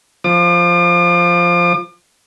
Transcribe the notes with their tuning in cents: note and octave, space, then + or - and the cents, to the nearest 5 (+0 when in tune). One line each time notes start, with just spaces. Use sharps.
F3 +0 D6 +45